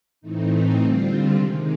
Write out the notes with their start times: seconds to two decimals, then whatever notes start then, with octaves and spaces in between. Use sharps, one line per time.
0.21 A2 E3 A3 C4 D#4
0.77 D3 G3 C4 F4
1.33 C3 D#3 G#3